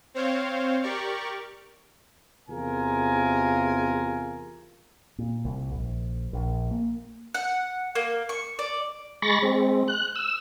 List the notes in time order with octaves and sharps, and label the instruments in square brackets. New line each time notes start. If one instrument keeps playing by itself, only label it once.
[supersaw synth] C4 C5 C#5 F5
G4 A#4 D5 C#6
[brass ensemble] E2 C3 F4 G#4 A#4 G#5
[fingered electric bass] A#2
C2
A#1
A#1
A#3
[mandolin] F#5
A#3
C#6
D5
[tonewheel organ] G#3 B5 C#6 A6 A#6
G#3 C4
F#6
E6